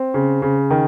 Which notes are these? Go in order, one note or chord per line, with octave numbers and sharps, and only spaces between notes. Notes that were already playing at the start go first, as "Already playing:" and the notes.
Already playing: C4
C#3
C#3
D#3